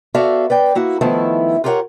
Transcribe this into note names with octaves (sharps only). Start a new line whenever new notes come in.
B3 F#4 A4 D5 E5 F5
B4 D5 G5
A#3 E4 F#4
D#3 F3 A3 B3 E4
F4 G4 A#4 B4 C#5 F#5